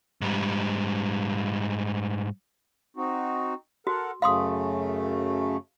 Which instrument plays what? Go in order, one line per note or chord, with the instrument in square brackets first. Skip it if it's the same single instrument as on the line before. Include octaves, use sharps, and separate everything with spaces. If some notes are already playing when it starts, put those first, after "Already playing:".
[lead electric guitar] G#2 G3
[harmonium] C4 D#4 F#4
[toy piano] F#4 [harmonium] A4 A#4 F#5
[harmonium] F#2 C#3 A3 [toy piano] F5 C6 D#6